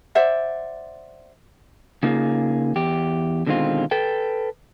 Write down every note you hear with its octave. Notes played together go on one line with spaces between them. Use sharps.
C5 D5 E5 F#5
C#3 A#3 D#4 F4 G#4
E2 G4
B2 D3 D#3 G#3 C4 F4
A4 B4 G5